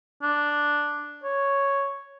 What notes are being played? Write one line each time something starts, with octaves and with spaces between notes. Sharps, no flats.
D4
C#5